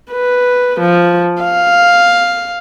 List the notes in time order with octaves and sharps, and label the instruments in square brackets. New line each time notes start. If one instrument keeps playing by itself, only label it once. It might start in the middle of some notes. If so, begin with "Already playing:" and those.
[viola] B4
F3
F5